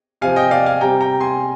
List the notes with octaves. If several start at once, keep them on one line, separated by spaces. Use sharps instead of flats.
C3 F3 F5 G#5
D#5 G5
D5 F5
F5 G#5
C3 G3 G5 A#5
G5 A#5
G#5 C6